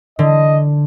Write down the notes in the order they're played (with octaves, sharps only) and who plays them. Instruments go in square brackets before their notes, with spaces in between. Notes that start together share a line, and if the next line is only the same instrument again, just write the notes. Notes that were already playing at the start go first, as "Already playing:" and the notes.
[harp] D3 [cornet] D#5